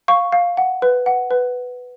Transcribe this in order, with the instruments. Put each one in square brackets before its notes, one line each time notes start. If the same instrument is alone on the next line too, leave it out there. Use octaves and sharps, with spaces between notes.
[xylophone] F5 C#6
F5
F#5
B4
F#5
B4